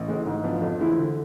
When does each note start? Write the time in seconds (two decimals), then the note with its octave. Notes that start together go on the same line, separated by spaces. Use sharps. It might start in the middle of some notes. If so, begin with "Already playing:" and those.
Already playing: A1
0.08 A2 G#3
0.26 G#2
0.44 F3 B3 D4
0.62 F2
0.79 E3 G#3 C4 E4
0.97 D3